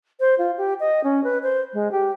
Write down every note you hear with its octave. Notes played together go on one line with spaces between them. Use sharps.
C5
F4
G4
D#5
C#4
B4
C5
G#3
G4